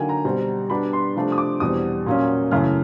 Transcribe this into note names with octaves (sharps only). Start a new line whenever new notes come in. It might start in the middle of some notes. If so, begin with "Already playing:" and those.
Already playing: D3 F#3 A#3 D#4 G5 G#5
A#5
B2 G3 C4
B2 G3 B3 D4 B5
C6
C3 F3 A3 D4
D#6
D6
E2 B2 G3 C4 D#6
A#2 F#3 A#3 C#4
F#2 C#3 E3 A3 F6